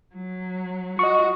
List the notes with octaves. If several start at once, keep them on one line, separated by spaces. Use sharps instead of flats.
F#3
F#4 D#5 C#6